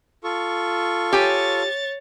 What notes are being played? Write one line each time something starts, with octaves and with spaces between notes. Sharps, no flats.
F4 A4 C#6
G4 C#5 G#5 A6